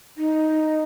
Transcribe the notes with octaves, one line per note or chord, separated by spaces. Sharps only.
D#4